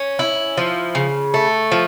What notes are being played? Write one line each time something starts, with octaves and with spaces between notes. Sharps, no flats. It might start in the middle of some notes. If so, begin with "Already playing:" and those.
Already playing: C#4
E4
F3
C#3
A3
F3